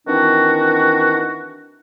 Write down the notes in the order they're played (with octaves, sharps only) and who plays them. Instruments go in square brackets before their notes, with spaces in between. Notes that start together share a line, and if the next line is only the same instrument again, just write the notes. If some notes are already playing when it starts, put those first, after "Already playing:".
[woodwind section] D#3 E3 C4 D4 F#4